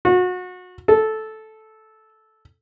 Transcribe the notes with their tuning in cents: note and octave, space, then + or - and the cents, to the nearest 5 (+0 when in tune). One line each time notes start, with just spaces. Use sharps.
F#4 -30
A4 -10